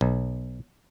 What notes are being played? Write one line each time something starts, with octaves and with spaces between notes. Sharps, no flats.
B1